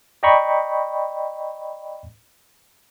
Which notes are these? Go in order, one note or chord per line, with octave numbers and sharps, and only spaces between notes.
D5 D#5 G5 A#5 B5 C#6